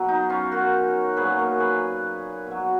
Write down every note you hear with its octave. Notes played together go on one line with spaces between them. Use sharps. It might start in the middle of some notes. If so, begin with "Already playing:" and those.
Already playing: B2 F#3
D#4
C#4 F4
F#4 A#4
A#2 F#3 G#4 B4
A#4 C#5
G#4 B4
B2 F#3